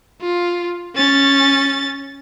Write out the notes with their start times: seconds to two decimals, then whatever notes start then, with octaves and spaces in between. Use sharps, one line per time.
0.22 F4
0.96 C#4 A6